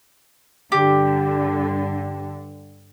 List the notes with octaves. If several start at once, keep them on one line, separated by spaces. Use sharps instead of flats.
G2 D3 G4